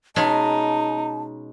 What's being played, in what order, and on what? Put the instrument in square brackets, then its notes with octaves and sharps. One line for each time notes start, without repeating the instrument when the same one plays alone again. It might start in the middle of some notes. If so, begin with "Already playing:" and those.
[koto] B2 G#3 C#4 [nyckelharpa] D#4 [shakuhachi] A5